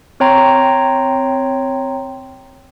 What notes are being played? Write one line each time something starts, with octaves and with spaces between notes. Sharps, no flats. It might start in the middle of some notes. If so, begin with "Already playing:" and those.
C4 C#5 G5 A#5 C6